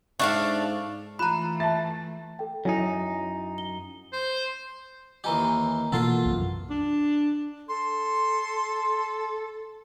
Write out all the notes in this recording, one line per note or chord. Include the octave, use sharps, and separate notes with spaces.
G#2 D4 A4 D5 E5 F5 C#6
E3 A3 F4 A#5 B5 F#6 E7
E5 A5 A6
A4 G5
F#2 F#3 D#4 E4 G#5
G7
C5
D#2 E3 G4 D#5 G#5 A#5
B2 E3 A#3 F4 A4 F#5 A6 C7
C2 F#2
D4
A4 C6